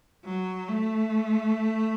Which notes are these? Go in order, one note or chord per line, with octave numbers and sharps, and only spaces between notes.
F#3
A3